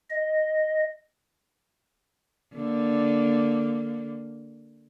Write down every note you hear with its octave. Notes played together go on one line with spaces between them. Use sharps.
D#5
D3 A#3